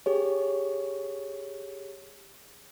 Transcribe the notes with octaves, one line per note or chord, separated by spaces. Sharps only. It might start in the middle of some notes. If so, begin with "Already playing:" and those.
G4 G#4 C#5